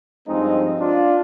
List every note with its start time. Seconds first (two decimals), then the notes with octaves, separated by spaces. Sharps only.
0.28 G2 F3 G#3 C4 D#4
0.80 D4 F4